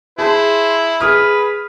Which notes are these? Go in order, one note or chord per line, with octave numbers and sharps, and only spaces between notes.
E4 G#4 C5 A5
G#4 B4 D#6 F6